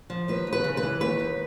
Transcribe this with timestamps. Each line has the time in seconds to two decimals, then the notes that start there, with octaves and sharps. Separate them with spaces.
0.10 F3
0.28 D#2 B4
0.47 D#2
0.53 B4
0.64 C#3
0.77 B4
0.83 E3
1.01 D#2 B4
1.19 D#2